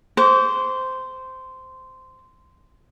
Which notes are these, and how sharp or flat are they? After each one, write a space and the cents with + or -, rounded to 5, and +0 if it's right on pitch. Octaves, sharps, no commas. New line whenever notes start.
C5 -10 D6 -45